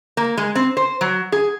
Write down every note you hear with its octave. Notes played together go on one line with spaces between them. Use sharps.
A#3
G#3
C4
C5
F#3
G#4